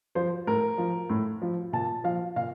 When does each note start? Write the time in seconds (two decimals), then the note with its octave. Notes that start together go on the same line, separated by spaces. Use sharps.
0.15 F3 C5
0.47 A2 A#4
0.78 F3
1.09 A2
1.42 F3
1.73 A#2 A5
2.04 F3 F5
2.36 A#2 F5